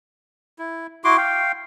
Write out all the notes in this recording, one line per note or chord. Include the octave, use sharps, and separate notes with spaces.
E4
E4 F#4 C6 D6
F5 G5